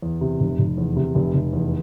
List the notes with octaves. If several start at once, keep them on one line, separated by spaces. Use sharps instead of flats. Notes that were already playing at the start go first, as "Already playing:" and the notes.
E2
C3
F1
F1
E2
C3
F1
F1
E2